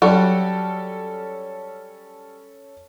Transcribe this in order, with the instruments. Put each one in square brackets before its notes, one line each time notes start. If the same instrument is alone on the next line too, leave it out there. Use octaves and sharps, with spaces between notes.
[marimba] F#3 [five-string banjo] G3 F#4 [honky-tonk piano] C#4 A4